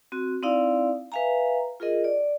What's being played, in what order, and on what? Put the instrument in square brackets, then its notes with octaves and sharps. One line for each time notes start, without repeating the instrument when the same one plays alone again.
[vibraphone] C4 F#4
C4 D#4 E4 D5 F5
B4 E5 F5 G#5 A#5
F4 G#4 A#4 D#5
D5